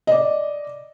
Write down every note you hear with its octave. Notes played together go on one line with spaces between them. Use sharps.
D5 D#5